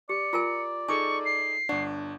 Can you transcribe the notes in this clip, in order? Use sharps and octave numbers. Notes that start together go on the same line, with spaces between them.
G4 D5 C#7
F4 A#4 G#5 A#5
D#4 G#4 A4 G#5 C#6 D6
C7
G1 D4 D5 F#5 C#6